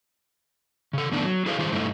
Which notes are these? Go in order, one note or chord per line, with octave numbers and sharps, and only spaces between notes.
C#3 A4
A2 D#3 A3 B3 D4 D#4
F#3
E4 G#4 A4 B4 C#5 F5
D#3 G3 F4 G#4 C5
G2 A3 D#4 E4